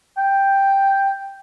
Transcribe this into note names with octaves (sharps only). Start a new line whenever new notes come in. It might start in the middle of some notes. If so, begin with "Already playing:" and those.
G5